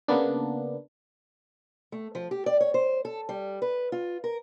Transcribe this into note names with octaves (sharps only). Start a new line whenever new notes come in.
C#3 A#3 B3 D4
A3
F3
G4
D5
C#5
C5
A4
G3
B4
F4
A#4